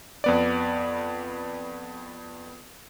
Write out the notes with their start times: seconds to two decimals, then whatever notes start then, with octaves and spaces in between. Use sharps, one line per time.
0.24 F2 B3 D5